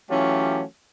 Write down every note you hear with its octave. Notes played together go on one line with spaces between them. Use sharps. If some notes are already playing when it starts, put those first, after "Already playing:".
E3 F#3 A3 C#4 F4 G4